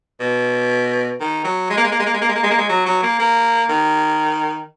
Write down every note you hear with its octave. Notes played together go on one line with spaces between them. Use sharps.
B2
D#3
F#3
G#3
A#3
G#3
A#3
G#3
A#3
G#3
A#3
G#3
A#3
G#3
A#3
G#3
F#3
F#3
A#3
A#3
D#3